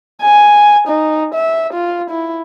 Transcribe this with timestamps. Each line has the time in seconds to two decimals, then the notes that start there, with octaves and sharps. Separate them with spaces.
0.22 G#5
0.88 D#4
1.35 E5
1.73 F4
2.10 E4